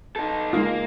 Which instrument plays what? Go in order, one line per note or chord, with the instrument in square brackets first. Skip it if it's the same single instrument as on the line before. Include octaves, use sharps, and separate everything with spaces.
[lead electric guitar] D#4 A4
[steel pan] G#3 D#4 F4 [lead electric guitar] A#3